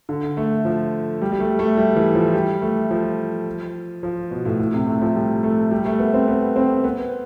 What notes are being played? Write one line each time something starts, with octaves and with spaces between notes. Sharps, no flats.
D3
A3
F3
G3
G3
A3
A3
G3
E3
F3
G3
A3
F3
F3
B2
A2
A2
C3
A3
F3
G3
A3
G3
A3
B3
C4
B3
C4
B3